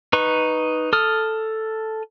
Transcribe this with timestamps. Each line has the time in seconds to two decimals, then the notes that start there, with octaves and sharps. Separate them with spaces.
0.13 D#4 B4 C#6
0.93 A4 D#6 F6